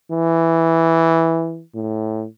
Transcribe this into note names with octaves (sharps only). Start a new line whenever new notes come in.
E3
A2